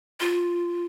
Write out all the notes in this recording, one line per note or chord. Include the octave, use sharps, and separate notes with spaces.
F4